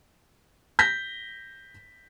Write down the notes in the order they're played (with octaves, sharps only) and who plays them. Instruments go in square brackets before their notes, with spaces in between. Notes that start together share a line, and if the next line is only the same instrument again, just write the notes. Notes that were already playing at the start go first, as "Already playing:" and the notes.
[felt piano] G6 A#6 B6